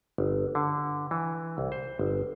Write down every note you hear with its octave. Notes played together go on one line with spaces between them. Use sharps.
G1
D3
E3
C2
C5
G1